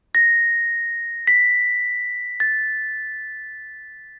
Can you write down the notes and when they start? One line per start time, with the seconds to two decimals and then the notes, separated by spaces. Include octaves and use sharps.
0.15 A#6
1.27 B6
2.40 A6